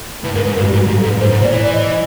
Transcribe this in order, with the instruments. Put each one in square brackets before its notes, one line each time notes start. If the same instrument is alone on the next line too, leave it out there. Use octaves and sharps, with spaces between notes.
[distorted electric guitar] A2 [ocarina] B4
[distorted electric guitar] G#2 [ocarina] A#4
[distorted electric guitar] G#2 [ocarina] B4
[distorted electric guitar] G2 [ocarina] A#4
[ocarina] F#4
G4
[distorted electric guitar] G#2
[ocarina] F#4
[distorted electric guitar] G#2 [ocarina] G4
[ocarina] A4
[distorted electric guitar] G#2
[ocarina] B4
[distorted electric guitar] G#2 [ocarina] C5
[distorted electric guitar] G#2
A#2
[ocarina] D5
[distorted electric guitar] E3 [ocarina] C#5
[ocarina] D5
D#5
D#5